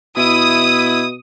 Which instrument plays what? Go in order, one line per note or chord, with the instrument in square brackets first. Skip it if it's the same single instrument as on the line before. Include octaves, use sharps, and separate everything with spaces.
[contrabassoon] B2 [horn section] E4 [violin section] D#6